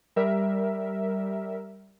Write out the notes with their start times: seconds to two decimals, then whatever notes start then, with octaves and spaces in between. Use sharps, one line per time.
0.16 G3 A#4 E5